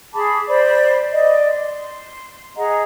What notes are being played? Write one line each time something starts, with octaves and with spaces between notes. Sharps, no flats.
G#4 A5 B5 D6
C5 D5 B5
D5 D#5
C6
G#4 D#5 F#5 A#5